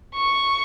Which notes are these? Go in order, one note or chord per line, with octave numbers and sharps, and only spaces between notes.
C#6